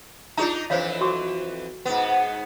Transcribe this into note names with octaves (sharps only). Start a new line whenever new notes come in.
D4 D#4 F4 G#4 A#5
F2 E3 E4 C5 C#5 F5
F#4 C#6 D6
G#2 B3